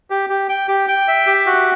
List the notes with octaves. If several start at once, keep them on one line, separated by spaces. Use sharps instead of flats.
G4
G4
G5
G4
G5
E5
G4
F#4